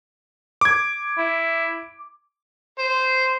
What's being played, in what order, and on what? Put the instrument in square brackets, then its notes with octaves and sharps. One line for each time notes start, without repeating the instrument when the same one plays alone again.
[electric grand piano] D6 G#6
[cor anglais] E4
[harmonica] C5